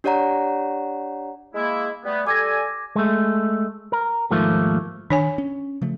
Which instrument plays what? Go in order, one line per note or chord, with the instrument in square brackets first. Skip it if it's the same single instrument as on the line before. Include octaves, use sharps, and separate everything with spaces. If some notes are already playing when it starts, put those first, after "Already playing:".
[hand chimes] D4 G4 C#5 D5 F#5 A#5
[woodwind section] G#3 A#3 E4
G3 A3 B3
[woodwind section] G3 A4 G#5 [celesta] D6 G#6 A#6
[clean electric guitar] G#3 A3
A#4
D#2 G#2 F3 A3 A#3
[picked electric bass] D#3 [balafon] D4 C#5 G#5
[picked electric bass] C#4
C#3 F3 A3